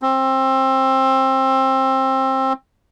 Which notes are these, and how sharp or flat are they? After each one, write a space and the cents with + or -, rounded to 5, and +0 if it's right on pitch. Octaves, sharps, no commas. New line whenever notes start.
C4 +20